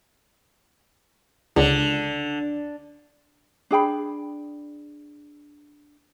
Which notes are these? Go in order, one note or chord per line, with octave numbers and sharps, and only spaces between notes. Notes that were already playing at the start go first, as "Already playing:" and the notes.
C#2 D3
D4 G#4 G5 B5